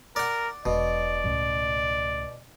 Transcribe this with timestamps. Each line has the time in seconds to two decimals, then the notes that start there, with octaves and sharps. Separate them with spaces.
0.16 A#4 D5 F#5
0.65 E1 B2 D5
1.24 C#2 A2